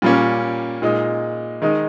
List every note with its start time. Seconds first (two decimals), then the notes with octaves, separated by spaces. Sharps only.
0.02 A#2 G3 A#3 C#4
0.82 A#2 G#3 D#4
1.62 D#3 G#3 D#4